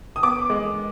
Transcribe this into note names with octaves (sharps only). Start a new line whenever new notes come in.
D#6
B3 D6
G#3